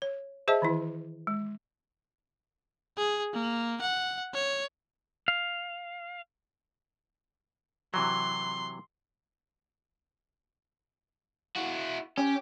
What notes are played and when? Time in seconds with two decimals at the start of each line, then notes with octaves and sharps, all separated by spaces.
0.02 C#5
0.48 G#4 C5 D#5 E5 A5
0.62 D#3 E3 E4
1.27 G#3
2.97 G#4
3.34 A#3
3.81 F#5
4.34 C#5
5.28 F5
7.94 C3 E3 F#3 C6
11.56 E4 F#4
12.18 C#4 G4